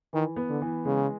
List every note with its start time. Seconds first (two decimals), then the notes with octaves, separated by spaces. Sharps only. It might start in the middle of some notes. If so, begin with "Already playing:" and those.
0.13 D#3 E3
0.36 B3
0.49 D3
0.62 E3
0.85 C#3 G#3